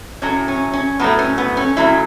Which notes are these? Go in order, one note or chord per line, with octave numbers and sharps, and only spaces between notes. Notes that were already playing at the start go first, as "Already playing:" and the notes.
A2 F#3 A3 C#4
C#4
C#4
A2 F#3 A3 B3
C#4
B3
C#4
C#3 F#3 A3 E4